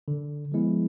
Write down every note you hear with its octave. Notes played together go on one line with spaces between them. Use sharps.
D3
F3 G#3 B3 E4